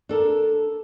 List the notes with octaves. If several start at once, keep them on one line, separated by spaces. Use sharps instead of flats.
D4 A4 A#4